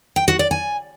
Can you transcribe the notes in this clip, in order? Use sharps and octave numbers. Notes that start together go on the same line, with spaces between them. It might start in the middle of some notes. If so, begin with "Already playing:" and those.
G5
F#4
D5
G#5